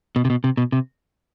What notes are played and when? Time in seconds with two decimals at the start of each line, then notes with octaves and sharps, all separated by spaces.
0.16 B2
0.25 C3
0.30 B2
0.44 C3
0.57 B2
0.72 C3